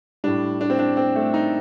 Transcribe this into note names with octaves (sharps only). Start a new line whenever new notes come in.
A2 G3 D4
D4
C4
D4
C4
A3
D#4